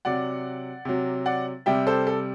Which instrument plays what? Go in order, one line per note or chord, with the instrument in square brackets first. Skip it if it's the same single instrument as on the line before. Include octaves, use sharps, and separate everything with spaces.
[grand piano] C3 F#3 D5 F#5
C3 F#3
D5 F#5
C3 G3 E5 G5
A4 C5
A4